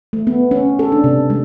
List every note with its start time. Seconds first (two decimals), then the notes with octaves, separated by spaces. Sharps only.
0.13 A3
0.27 B3
0.51 C#4
0.79 A4
0.92 D4
1.04 C3
1.30 G#3